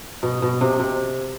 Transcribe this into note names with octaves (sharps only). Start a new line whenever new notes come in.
B2
B2
C3
C3